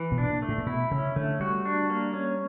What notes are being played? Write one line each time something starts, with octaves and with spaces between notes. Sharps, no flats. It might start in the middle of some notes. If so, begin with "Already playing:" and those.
Already playing: E3
B2
D4
A#2
A3
A2
A#2
B2 E4
C#3 C#4
D3 A3
G3 F#4
D4
A#3
C#4